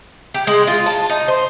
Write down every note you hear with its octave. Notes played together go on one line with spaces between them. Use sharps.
G4
G#3
F4
A5
D#4
C5